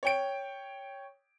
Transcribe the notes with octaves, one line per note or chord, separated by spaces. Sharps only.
C#5 G5 D7